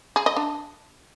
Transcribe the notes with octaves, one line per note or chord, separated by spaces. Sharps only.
G#4
D#5
D4